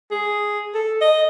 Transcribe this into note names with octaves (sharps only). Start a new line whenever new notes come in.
G#4
A4
D#5